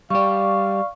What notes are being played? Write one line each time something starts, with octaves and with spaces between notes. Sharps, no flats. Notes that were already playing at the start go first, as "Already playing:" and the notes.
G3 G4 D5 F5 C#6